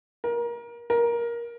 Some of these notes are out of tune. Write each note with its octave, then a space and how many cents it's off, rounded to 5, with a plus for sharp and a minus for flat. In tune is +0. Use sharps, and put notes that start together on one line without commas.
A#4 +25
A#4 +15